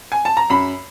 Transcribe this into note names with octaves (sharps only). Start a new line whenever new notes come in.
G#5
A5
A#5
F#2 B5